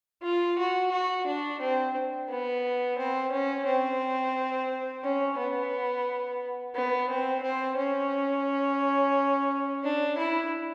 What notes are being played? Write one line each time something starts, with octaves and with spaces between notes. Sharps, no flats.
F4
F#4
F#4
D4
C4
B3
C4
C#4
C4
C#4
B3
B3
C4
C4
C#4
D4
E4